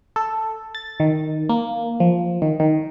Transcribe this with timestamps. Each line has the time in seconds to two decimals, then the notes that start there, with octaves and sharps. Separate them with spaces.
0.16 A4
0.75 A6
1.00 D#3
1.49 A#3
2.00 F3
2.42 D#3
2.60 D#3